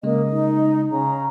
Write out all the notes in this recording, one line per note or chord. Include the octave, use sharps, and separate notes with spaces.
C#3 G#3 A#3 D#5
D#4
C#3 A#5